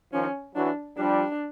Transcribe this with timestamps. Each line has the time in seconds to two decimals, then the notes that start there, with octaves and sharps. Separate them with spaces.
0.13 D#3 F3 C#4
0.55 E3 F#3 D4
0.97 F3 G3 D4